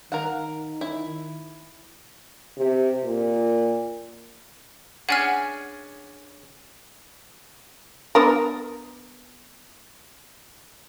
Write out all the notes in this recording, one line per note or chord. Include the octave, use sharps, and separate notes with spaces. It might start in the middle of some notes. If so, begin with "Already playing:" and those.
D#3 A#4 F5 F#5
E4
C3
A#2
C#4 D4 G#4 F#5 G#5 F6
B3 D4 A#4